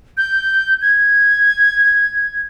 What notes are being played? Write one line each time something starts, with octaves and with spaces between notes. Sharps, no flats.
G6
G#6